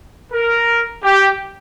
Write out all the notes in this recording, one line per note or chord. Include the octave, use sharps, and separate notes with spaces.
A#4
G4